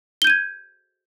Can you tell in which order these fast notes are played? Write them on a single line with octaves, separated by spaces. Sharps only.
G7 G6 D#7 G#6